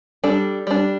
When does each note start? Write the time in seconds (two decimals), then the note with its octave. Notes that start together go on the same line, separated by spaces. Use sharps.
0.24 G3 D4 A4
0.67 G3 D4